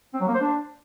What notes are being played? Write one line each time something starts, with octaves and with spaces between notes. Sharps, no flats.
C4
F#3
A#3
C5
D4